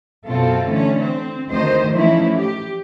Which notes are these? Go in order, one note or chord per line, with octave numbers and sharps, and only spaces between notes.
F#2 B2 C4 F4 A4
D3 E3 A3 C#4
C4
D2 D#3 C5 D#5
E3 F3 A3 C#4 D#4 E4
G4